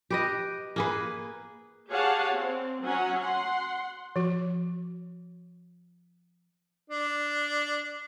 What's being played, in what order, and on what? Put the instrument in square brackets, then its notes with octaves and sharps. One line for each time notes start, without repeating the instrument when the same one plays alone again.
[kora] G4 B4 D#5
A#3 G#4 B4
[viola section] G4 G#4 C#5 F5 F#5 A5
C4
F#3 C#4 F#5
F#5 C6
[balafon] F3 F#4
[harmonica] D4